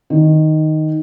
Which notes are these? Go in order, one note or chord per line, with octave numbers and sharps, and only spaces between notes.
D#3